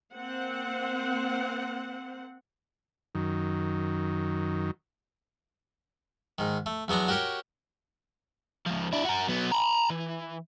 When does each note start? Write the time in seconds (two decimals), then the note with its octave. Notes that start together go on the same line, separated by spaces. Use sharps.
0.14 A#3 C4 F#5
3.15 F#2 D#3
6.38 G#2 D#3
6.66 A3
6.88 E2 F#3 B3 D4 A#5
7.08 F#4 G4 A#4 C#5 G5
8.67 C#2 F3
8.93 D4 E4
9.05 F#4 A#4
9.29 F#3 B3
9.52 A#5 B5
9.90 E3